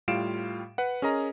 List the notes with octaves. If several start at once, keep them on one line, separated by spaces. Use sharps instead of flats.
A2 G3 F4 F5 D7 E7
B4 F#5
C#4 G#4 A#4 D#5 A#5